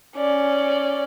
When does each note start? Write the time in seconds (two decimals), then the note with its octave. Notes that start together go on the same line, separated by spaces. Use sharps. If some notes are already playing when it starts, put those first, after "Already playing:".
0.16 C#4 D5